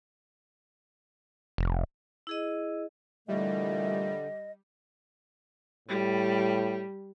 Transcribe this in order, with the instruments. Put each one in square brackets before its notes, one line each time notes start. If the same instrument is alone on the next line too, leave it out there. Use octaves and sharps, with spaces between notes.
[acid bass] F1
[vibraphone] E4 G#4 D#5
[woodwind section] A#2 E3 A3 [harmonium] D3 [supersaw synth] G3 [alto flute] D#5
[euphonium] A2 [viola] G3